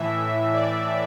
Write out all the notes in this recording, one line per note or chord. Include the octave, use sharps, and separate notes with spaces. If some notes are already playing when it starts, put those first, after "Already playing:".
Already playing: A2 E3 E5
D5